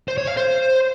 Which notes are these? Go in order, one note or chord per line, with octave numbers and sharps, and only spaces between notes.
C5
C#5
F5
C5